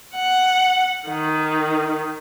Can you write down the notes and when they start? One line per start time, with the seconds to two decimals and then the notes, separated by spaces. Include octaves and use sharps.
0.15 F#5
1.08 D#3